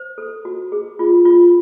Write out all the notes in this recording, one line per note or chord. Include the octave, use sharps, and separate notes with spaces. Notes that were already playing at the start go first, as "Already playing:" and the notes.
Already playing: C5
A4
F#4
G#4
F4
F4